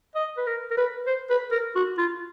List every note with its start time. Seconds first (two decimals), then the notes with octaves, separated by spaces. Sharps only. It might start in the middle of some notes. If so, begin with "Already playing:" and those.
0.15 D#5
0.37 B4
0.47 A#4
0.71 A#4
0.77 B4
1.07 C5
1.30 B4
1.52 A#4
1.75 F#4
1.98 F4